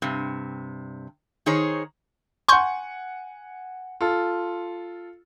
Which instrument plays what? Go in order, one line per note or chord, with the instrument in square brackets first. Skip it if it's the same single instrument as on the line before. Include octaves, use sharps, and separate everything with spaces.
[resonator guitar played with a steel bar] G2 C3
D#3 D#4 G#4 C5 C#5
[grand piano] F#5 G#5 [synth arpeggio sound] C6 C#6 G6
[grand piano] F4 A4